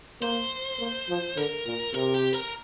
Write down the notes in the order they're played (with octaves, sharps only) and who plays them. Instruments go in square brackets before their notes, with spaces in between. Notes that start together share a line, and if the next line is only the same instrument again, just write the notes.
[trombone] A#3 [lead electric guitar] C5
[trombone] A#3
F3
[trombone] D3 [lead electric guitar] A#4
[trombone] A#2
[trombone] C3 [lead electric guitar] A#4
[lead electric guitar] G4
A#4